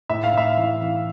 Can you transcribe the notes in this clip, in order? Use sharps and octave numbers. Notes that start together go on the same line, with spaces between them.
A2 E5
F5
A2 E5
E3
E3